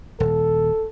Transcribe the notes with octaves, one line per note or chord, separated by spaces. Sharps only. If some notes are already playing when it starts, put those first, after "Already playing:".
D#1 A4